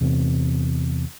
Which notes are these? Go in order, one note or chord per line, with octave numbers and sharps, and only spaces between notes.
E2 C3